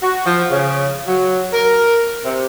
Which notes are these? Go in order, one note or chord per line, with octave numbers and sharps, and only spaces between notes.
F#4
F3
C#3
F#3
A#4
C3